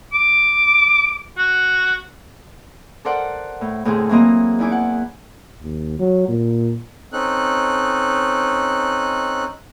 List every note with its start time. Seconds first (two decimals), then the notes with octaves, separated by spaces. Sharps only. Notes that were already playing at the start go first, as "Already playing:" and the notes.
0.13 D6
1.37 F#4
3.05 A4 A#4 C5 D5 F#5
3.61 A2
3.85 D2 A2 C3 C4 G#4
4.09 E3 F#3 A#3 C4 D#5 A#5
4.59 E2 D#4 E4 G#5 D6
4.72 F#5
5.62 D#2
5.99 F#3
6.28 A#2
7.13 C4 C#4 D#4 A4 F#6